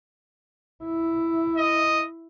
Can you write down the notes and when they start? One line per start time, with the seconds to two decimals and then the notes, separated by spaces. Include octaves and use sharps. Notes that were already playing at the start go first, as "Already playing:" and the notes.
0.84 E4
1.57 D#5